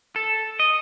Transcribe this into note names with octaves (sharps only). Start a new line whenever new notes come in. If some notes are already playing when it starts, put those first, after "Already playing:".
A4
D#5